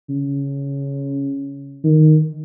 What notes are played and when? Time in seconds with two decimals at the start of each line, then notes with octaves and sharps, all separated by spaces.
0.10 C#3
1.84 D#3